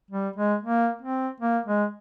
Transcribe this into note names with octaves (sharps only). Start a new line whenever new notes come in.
G3
G#3
A#3
C4
A#3
G#3